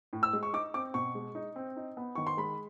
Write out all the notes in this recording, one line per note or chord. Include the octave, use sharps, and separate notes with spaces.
A2
E6
G#3
C#6
D#4 D6
C4 D6
B2 C#6
G#3
D#4
C4
D#4
B3
D#3 C#6
C6
G#3 B5